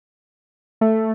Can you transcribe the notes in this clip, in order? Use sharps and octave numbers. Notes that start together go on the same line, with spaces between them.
A3